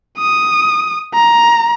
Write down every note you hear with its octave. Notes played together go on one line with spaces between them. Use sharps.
D#6
A#5